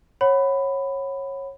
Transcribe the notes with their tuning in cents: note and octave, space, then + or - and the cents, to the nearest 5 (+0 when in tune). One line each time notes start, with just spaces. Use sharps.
C#5 -25 F#5 +0 B5 +15